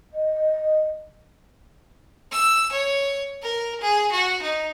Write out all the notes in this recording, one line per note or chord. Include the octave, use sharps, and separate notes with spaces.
D#5
E6
C#5
A#4
G#4
F#4
D#4